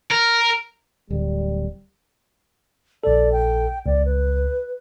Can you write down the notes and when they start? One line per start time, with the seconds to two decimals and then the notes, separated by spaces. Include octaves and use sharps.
0.11 A#4
1.10 D1 G3
3.04 A#1 A4 D5
3.32 G5
3.86 C#2 D5
4.05 B4